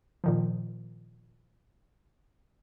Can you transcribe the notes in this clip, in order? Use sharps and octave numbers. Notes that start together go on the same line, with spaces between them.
A#2 D#3 F3